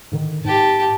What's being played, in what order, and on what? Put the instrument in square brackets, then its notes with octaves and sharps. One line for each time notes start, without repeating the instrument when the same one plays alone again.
[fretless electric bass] G#2 D3 D#3
[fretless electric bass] G#2 [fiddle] G4 A5